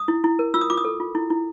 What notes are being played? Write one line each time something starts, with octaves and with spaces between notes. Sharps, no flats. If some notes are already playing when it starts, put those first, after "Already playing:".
Already playing: D#6
E4
E4
A#4
F4 E6
D#6
F4 D6
D#6
A4
F4
E4
E4